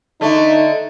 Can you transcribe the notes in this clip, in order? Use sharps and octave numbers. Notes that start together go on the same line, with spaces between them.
D3 A3 D#4